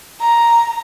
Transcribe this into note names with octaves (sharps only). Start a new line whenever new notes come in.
A#5